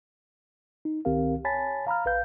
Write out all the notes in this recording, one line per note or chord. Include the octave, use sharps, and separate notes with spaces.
D#4
C#2 D#3 C4 G4 A#4 F5
C#5 G#5 A5 B5 A6 B6
F5 A#5 B5 F6
A#1 B4 F5 G6